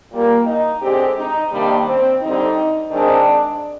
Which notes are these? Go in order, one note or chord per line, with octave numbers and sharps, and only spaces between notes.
A#2 G3 A#3
D#4
D3 G#3 C4 G4
D#4
C3 D#3 G3 A#3 D4
C4
D3 G3 C4 D#4
D#3 G#3 C4 D4